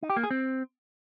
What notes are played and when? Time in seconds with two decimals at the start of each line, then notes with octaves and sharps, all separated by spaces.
0.03 D#4
0.10 G4
0.17 A#3
0.24 G#4
0.31 C4